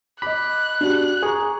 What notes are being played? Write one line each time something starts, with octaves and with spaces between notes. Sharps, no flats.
D#5 B5 D6 F#6
D4 F#4 G4
G#4 A#5 C#6